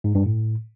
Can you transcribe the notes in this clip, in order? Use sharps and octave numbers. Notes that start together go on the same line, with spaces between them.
G#2
G2
A2